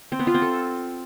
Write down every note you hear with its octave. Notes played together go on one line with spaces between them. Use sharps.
C4
B3
F4
C4
A4